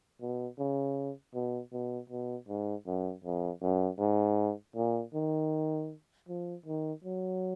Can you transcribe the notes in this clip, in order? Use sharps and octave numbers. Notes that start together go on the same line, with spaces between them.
B2
C#3
B2
B2
B2
G#2
F#2
F2
F#2
G#2
A#2
D#3
F3
D#3
F#3